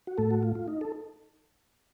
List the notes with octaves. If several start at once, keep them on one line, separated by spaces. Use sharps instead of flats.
F#4
A2 A3 A4
F#4
F4
F4
D#4
A4